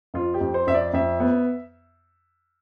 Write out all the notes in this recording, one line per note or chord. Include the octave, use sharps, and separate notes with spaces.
F2 F4
G4
F2
C5
F2 E5
D5
F2 E5
B3